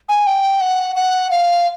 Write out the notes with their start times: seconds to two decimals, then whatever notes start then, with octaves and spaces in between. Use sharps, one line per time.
0.09 G#5
0.27 G5
0.61 F#5
0.96 F#5
1.31 F5